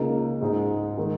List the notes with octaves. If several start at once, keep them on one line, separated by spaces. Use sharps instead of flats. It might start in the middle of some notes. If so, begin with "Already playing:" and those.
Already playing: C#2 C#3 A#3 D#4
G#2 G#3 D#4
D#3 G#3